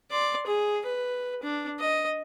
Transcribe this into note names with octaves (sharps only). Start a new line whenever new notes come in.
D5 C6
G#4
B4
D4
D#5